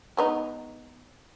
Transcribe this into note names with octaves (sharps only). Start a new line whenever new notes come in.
G#3 B3 D#4